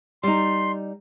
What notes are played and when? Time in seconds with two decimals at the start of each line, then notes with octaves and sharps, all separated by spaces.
0.23 G3 D#4 C6